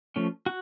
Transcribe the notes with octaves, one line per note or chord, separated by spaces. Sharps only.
F3 A3 C#4
F#4